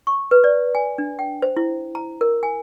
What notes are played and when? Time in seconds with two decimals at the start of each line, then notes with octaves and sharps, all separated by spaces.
0.07 C#6
0.31 B4
0.44 D5
0.75 G#5
0.98 D4
1.19 G5
1.42 C5
1.57 E4
1.95 A#5
2.21 A#4
2.43 G#5